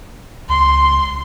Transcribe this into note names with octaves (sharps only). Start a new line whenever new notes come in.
C#2 C6